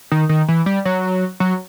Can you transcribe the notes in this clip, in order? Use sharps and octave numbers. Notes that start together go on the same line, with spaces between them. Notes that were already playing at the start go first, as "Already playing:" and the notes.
D#3
D#3
E3
G3
F#3
F#3